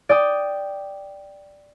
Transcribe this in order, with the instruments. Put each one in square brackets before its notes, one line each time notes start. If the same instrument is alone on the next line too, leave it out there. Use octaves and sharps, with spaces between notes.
[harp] D5 G5 D#6